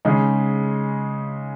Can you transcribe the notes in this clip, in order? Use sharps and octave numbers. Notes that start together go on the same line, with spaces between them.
C#3 G#3 D#4